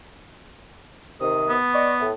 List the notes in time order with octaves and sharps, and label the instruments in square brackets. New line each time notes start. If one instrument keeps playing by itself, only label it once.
[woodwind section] C3 D#3 D#6
[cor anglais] B3
[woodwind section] D5 D#5 C#6
A2